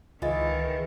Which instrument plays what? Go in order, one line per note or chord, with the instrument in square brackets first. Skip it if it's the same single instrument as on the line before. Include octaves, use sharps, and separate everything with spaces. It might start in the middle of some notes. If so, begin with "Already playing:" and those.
[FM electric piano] C#2 F4 A6 [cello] D#3 [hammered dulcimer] E3 [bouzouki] G#3